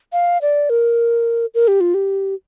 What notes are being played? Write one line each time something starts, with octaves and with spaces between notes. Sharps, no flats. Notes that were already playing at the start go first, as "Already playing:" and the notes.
F5
D5
A#4
A#4
G4
F4
G4